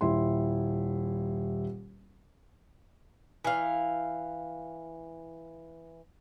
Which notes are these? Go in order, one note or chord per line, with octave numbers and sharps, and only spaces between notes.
D#1 E4 C6
E3 F5